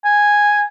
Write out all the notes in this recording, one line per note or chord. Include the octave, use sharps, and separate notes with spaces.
G#5